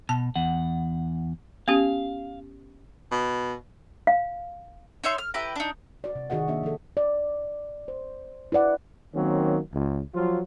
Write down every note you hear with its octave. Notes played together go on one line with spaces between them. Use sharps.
B2 A5
E2 F#5
B3 C#4 G4 F5
B2
F5
D#4 C#5 E5 C6
F6
E4 G4 B4 A#5
D4 D#4
F#4 D5
C3
D#3 F#4 G#4 D#5 F#5
A#3 D4 F#4 E5
F3 D4 A4
D5
C5
E4 B4 D5 F#5
D#3 F#3 A#3 C4 C#4
C#2
F3 F#3 F4